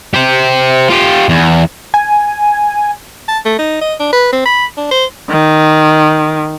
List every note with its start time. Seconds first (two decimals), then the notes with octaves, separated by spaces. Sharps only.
0.14 G4 C5
0.90 F4 G4
1.29 E2
1.94 G#5
3.28 A5
3.45 A3
3.59 D#4
3.81 D#5
4.00 D4
4.13 B4
4.33 C4
4.46 B5
4.77 D4
4.91 C5
5.29 D#3